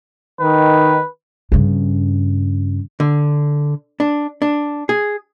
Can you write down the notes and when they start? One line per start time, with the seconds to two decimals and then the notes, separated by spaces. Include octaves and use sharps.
0.41 D#3 B4
1.52 G2 C#3
3.00 D3
4.00 D4
4.42 D4
4.89 G#4